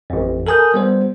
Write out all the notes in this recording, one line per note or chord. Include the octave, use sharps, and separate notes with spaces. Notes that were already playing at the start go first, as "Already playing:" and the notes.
A1 F2
A4 A#4 G#5 D#6 G6
G3 B3 C5